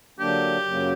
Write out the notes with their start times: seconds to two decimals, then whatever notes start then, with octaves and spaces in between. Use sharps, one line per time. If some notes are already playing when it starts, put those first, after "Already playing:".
0.19 D3 F#3 A#3 D4 G4
0.67 F#2 C#3 F#3 A#3